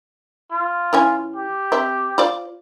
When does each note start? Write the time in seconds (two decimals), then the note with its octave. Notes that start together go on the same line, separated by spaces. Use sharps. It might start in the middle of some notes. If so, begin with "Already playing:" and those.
0.51 F4
0.93 E3 C#4 G#5
1.36 G4
1.72 C4 E5
2.18 F4 C5 D5